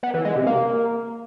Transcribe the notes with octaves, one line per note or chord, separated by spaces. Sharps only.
B3
E3
G#3
C3
A#3